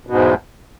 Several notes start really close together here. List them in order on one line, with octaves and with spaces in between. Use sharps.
B2 G#2 E2